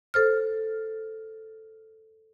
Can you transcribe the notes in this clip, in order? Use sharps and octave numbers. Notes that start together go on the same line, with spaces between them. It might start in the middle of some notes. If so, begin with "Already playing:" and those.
A4 C5 F6